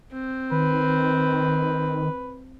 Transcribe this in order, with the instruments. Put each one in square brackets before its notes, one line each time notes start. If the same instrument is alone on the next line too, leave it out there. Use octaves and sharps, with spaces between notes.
[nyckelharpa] C4
[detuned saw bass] D#3 [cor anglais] B4